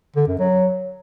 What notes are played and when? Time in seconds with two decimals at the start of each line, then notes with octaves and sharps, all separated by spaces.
0.16 D3
0.28 F#2
0.39 F#3